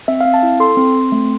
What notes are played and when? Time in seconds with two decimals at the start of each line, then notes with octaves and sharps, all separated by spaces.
0.08 C4 E5
0.21 C4 F5
0.34 A5
0.43 E4
0.60 A4 C6
0.77 C4
0.95 C4
1.12 A3